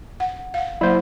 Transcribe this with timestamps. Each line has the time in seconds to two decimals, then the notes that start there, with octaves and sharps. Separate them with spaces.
0.20 F#5
0.54 F5 F#5
0.81 F#3 A#3 E4 C5